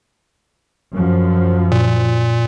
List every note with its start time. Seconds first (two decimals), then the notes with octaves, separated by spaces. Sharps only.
0.95 F#2 F3
1.72 A#2